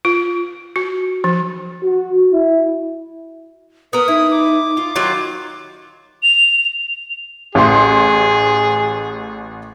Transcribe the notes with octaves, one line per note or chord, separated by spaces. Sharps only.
F4
F#4
F3
F#4
E4
B3 A#4 B4 D#6
D#4 E4
D6
F4
D#3 F#3 F4
F7
A1 G#4 C6